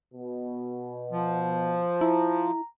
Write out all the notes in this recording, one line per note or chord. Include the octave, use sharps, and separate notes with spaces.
B2
F3
E4 A#5